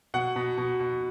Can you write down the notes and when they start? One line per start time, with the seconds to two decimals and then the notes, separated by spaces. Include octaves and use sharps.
0.14 B2 F#5
0.36 B2
0.58 B2
0.80 B2